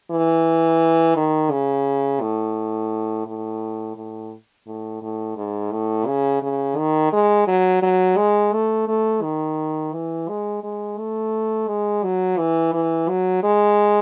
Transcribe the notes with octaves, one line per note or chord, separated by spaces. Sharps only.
E3
D#3
C#3
A2
A2
A2
A2
A2
G#2
A2
C#3
C#3
D#3
G#3
F#3
F#3
G#3
A3
A3
D#3
E3
G#3
G#3
A3
G#3
F#3
E3
E3
F#3
G#3